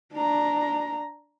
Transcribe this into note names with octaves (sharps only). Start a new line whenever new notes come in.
D4 A#5